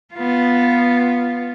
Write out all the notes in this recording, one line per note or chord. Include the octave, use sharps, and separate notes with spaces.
B3 F4